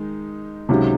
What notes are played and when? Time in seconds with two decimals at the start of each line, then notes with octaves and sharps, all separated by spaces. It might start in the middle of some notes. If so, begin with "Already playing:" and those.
Already playing: D#3 G#3 D#4
0.69 C#2 C3 D#3 F#3 C#4